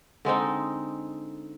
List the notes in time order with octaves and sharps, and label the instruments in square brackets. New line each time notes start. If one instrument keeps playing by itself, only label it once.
[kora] D3 G#3 C4 D#4